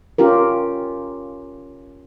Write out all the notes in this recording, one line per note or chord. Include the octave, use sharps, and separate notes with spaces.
C#4 F4 G4 A#4